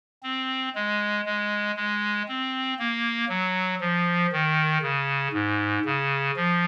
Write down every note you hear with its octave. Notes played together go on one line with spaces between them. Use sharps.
C4
G#3
G#3
G#3
C4
A#3
F#3
F3
D#3
C#3
G#2
C#3
F3